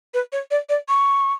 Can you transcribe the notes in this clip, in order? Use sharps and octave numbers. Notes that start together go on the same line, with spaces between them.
B4
C#5
D5
D5
C#6